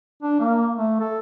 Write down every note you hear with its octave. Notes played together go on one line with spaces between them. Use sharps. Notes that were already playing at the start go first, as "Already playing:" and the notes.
D4
A#3
A3
A4